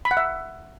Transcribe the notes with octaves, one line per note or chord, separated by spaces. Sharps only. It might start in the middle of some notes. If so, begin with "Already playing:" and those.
B5
F#5
E5